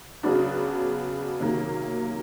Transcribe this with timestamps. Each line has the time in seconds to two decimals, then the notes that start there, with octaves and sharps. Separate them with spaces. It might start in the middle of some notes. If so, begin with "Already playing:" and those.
0.23 C#3 F#3 B3 D4 F#4
1.40 C3 D#3 F#3 A#3